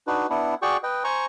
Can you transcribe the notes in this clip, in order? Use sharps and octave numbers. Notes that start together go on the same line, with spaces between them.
D4 D#4 F#4 B4
B3 D4 E4
F#4 G#4 D5 G5 C#6
B4 D#5 G5
C5 G#5 A#5 C#6